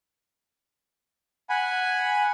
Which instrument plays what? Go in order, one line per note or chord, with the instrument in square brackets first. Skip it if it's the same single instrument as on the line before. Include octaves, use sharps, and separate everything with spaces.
[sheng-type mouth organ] F#5 G#5 B5